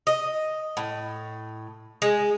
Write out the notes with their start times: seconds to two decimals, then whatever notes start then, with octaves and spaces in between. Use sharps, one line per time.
0.07 D#5
0.77 A2
2.02 G#3